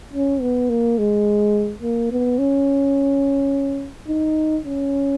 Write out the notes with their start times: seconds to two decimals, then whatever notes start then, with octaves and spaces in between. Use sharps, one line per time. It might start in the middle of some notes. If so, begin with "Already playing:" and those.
0.13 C#4
0.41 B3
0.70 A#3
0.98 G#3
1.82 A#3
2.11 B3
2.39 C#4
4.08 D#4
4.64 C#4